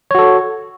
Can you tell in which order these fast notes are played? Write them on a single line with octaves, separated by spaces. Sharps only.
C#5 F#4 A4